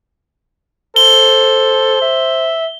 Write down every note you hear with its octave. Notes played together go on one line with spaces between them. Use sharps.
A4 C5 G7
E5